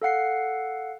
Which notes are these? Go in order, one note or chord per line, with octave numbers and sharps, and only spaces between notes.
A4 F5 F#5 C7